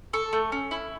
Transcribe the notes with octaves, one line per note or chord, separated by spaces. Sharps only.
A4 C#6
A3
C#4
E4